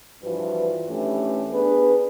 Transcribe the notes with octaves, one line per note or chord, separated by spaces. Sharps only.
G2 E3 F3 F#4 B4
E3 A3 C#4 D4 G4 B4
B3 D4 G#4 B4